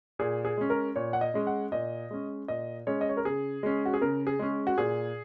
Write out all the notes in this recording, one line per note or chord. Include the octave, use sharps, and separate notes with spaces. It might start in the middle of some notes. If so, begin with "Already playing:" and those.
A#2 G#4
G#4
G#3 C#4
A#4
A#2 C#5
F#5
D#5
G#3 C#4
F#5
A#2 D#5
G#3 C#4
A#2 D#5
G#3 C#4 C#5
D#5
C#5
A#4
C#3 G#4
G#3 C#4
F#4
G#4
C#3 A#4
G#4
G#3 C#4
F#4
A#2 G#4